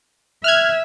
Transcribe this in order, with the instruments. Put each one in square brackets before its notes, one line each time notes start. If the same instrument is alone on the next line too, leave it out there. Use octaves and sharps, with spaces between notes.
[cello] E5 [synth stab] F6 F#6 G#6